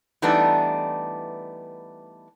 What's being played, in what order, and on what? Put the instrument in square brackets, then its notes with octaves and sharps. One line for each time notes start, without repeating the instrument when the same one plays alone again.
[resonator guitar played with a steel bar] E3 G3 A3 B3 D4 D#4